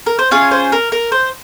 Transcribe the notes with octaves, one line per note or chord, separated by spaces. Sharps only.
A#4
C5
C#4 F4 G#4 C#5
C5
A#4
A#4
C5